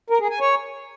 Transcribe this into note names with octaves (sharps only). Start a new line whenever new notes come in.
A#4
G#4
G#5
C#5